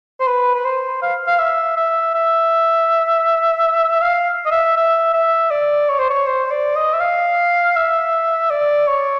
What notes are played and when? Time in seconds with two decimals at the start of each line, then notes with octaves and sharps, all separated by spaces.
0.20 C5
0.27 B4
0.55 B4
0.65 C5
1.02 F5
1.27 F5
1.39 E5
1.77 E5
2.14 E5
4.02 F5
4.46 D#5
4.51 E5
4.77 E5
5.13 E5
5.51 D5
5.89 C#5
5.99 C5
6.10 C#5
6.27 C5
6.51 D5
6.76 D#5
6.94 E5
7.00 F5
7.76 E5
8.50 D5
8.88 C#5